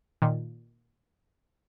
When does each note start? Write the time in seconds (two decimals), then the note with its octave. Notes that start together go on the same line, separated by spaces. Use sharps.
0.22 A#2 D#3